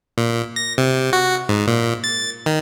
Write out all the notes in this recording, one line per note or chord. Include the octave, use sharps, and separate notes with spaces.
A#2
A#6
C3
F#4
G#2
A#2
A6
D#3